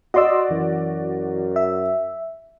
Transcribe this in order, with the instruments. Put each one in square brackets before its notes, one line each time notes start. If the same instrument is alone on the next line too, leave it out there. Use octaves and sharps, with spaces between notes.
[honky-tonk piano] F#4 D5 [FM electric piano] D#5 C6 E6
[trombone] F#2 [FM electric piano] E3
[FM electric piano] E5